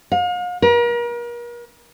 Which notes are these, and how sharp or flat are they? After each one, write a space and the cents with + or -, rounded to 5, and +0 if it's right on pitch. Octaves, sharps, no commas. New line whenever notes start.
F5 +40
A#4 +40